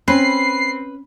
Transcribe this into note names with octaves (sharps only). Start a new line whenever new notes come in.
C4 C#4 B4 C7